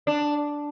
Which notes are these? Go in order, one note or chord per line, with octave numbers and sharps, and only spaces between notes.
D4